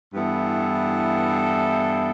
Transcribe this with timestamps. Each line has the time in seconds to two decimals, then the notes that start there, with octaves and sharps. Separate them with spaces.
0.14 G2 E3 B3 E4 A4